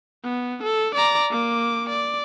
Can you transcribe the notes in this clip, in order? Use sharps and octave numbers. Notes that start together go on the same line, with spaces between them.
B3
A4
D5 A#5
A#3 D6
D5